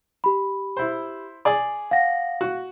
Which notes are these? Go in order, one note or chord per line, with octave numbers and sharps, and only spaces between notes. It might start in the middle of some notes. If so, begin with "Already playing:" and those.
G4 B5
E4 C5
G#4 D5
F5 F#5 A#6
F#4